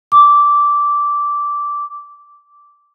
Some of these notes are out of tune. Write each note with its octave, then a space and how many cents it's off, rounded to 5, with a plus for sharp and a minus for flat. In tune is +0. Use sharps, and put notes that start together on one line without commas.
D6 -10